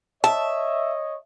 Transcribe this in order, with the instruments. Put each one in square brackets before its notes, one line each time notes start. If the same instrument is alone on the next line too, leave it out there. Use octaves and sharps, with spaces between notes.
[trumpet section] C#5 D#5 [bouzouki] E5 [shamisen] A5